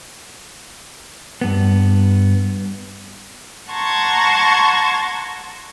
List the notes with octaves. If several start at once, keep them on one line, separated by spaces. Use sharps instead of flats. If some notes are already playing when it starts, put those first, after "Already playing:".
G2 B3
F#5 A5 A#5 C6 C#6 G#6